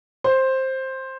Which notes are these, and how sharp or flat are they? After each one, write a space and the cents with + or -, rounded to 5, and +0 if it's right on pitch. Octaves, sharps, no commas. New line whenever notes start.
C5 +10